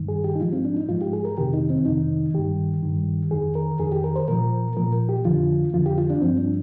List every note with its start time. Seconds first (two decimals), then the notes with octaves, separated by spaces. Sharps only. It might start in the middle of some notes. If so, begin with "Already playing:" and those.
Already playing: G2 D#3
0.08 G#4
0.24 G4
0.35 D#4
0.40 G#2 F3 F4
0.52 C4
0.65 D4
0.77 D#4
0.89 G#2 F3 F4
1.01 G4
1.13 G#4
1.25 A#4
1.38 F2 C3 D#3 G4
1.53 D#4
1.70 C4
1.86 F2 C3 D#3 D#4
2.34 G2 D#3 G4
2.83 G2 D#3
3.31 F2 D#3 G#4
3.55 A#4
3.80 F2 D#3 G#4
3.92 G4
4.04 A#4
4.16 C5
4.28 A#2 F3 A#4
4.77 A#2 F3 A#4
5.09 G4
5.25 F2 D3 F3 F4
5.74 F2 D3 F3 F4
5.86 G4
5.98 F4
6.10 D4
6.22 G2 F3 C4
6.38 D4